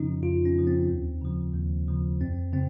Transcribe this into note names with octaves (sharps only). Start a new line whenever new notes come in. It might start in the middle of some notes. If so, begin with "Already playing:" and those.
Already playing: F2 C#3 F3 C#4 D#4
F2 F4
C#4
C#3 F3
C4
D#2
C#3 F3
D#2
C#3 F3
F2 C4
C#3 C4